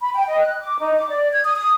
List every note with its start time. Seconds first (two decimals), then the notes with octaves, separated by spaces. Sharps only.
0.01 B5
0.14 G5
0.29 D#5
0.42 F#6
0.61 D6
0.79 D#4
0.97 D6
1.09 D5
1.32 G#6
1.44 D#6
1.56 D#6